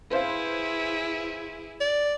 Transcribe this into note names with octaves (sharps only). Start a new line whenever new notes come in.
E4 G#4 B4 C5 F5
D5